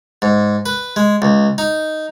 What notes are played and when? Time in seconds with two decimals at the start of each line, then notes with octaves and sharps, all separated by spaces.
0.22 G#2
0.66 B4
0.96 G#3
1.22 C#2
1.58 D#4